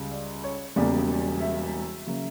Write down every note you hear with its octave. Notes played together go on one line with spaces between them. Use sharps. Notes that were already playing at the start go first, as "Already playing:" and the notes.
Already playing: C#2 C#3 G3
D5
C#5
E1 E2 C#3 G3 A#3 D5
E5
C#3 F#3 A#3